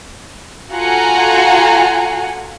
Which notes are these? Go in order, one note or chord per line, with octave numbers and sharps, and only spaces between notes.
F4 F#4 A4 F#5 G#5 A#5